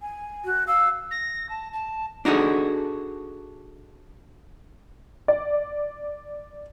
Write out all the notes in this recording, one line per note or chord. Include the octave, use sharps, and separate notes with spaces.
G#5
F#4
F5 E6
A#6
A5
A5
D4 D#4 F#4 G#4 A4
D5